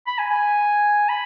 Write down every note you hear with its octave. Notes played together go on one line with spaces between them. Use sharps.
B5
G#5
G#5
B5